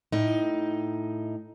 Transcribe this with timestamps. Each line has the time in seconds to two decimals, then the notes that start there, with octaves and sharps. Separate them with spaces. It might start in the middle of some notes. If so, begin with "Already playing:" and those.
0.12 A2 D#4